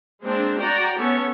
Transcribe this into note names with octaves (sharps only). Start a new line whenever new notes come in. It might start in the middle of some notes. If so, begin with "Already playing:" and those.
G#3 A#3 C4 D4
F#4 D5 G5 A#5
B3 C#4 A4 C#5